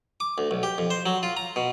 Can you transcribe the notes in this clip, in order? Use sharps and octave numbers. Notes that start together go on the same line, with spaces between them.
D6
D2
B1
G4
F2
C5
F#3
F4
A#5
B2